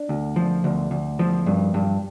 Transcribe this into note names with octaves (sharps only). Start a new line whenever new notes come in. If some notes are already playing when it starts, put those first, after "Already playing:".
Already playing: D4
D2
F3
D2
D2
F3
G2
G2